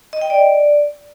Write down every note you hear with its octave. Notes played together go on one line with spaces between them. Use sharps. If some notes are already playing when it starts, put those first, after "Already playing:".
D#5
G5
D5